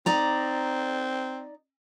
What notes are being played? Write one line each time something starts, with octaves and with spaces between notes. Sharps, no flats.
C4 D#4 D5 A#5